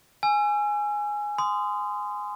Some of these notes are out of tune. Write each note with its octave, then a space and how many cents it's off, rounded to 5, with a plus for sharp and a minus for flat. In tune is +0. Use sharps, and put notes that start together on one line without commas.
G#5 +0 E6 +40
C6 -30 D#6 -15